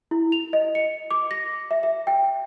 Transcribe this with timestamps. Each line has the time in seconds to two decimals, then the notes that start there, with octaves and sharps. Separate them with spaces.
0.11 E4
0.32 F7
0.53 D#5
0.75 C#7
1.11 D6
1.31 A#6
1.71 E5
1.83 E5
2.07 G5